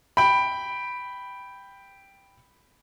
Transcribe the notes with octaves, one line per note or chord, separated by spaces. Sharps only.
G5 B5